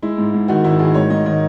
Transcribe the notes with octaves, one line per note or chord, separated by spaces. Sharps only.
G#3 E4
G#2
G#2
D#3 F#4
G#1 E4
D#3 G#4
G#2 C#5
G#2 D#5
D#3 D#5